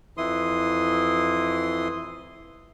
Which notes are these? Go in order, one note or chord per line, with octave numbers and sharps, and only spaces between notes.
F2 E3 E4 C6 D#6